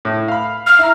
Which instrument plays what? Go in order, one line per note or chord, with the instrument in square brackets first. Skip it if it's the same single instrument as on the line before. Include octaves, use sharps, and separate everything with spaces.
[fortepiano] A2
F5 B5
[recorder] F6
[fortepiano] E4 A#5